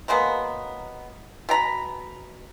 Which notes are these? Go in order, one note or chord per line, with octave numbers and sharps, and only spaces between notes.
F#3 G#3 A#3 B3
B2 G5 A#5 B5